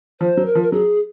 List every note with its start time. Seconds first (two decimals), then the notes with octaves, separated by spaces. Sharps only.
0.21 F3 C5
0.37 F#3
0.46 A#4
0.55 F3
0.63 A#4
0.72 F#3 G#4